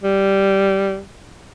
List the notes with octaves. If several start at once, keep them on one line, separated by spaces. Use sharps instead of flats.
G3